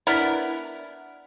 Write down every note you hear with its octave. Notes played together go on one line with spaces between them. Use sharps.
B3 D4 E4 A#4